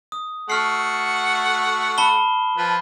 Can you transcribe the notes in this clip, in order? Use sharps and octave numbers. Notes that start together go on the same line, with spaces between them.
D#6
A3 F#4 F#5 F6 C7
A5 B5 G7
F3 B4